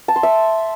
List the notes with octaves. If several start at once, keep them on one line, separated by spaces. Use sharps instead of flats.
A5
C6
E5